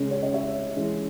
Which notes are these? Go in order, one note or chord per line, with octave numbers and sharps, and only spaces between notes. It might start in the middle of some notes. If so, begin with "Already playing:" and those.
Already playing: C#3 G#3 C#4
C#5
D#5
C#5 E5
E3 G#3 C#4